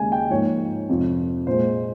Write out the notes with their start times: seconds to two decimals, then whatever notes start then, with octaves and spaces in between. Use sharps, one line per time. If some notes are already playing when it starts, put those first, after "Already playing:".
Already playing: D#2 C#3 G#3 G#5
0.12 G5
0.30 G#2 F3 A#3 C#5
0.89 F2 C3 F3
1.47 A#2 G#3 C5